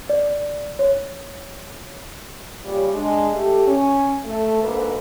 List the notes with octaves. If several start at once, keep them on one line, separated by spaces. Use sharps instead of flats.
D5
C#5
A#2 C#3 G3 G4 C#5
G#3 D4
A3 G4
C#4
A3
D2 G#2 A#3 A4 B4